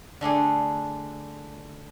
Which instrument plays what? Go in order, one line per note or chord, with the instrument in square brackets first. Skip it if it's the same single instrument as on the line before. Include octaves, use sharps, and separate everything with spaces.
[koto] D3 A3 D4 G#4